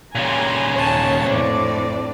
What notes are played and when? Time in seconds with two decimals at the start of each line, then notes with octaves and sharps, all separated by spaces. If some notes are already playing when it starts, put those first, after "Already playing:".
0.15 A#2 C#3 G4 G#5 A#5 C6
0.74 D#2 C#4 C#5 A5
1.26 F2 A2 C4 D4 D5